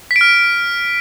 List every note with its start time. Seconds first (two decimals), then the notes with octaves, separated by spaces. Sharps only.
0.11 B6
0.16 D7
0.21 F6